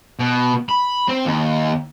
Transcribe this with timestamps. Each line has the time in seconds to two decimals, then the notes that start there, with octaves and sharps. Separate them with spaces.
0.19 B2
0.69 B5
1.08 C4
1.25 D#2